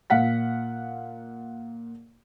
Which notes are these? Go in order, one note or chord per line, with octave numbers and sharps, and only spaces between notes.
A#2 F5 F#5 B6